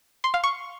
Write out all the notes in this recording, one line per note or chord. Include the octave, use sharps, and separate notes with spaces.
C6
F5
C#6